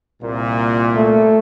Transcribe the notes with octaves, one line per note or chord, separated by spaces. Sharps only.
C2 A#2
A3